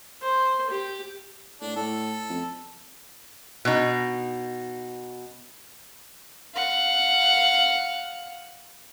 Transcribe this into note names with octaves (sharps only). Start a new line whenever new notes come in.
C5
G4
A2 D4
A2 A4
F2
B2 D#4
F5 F#5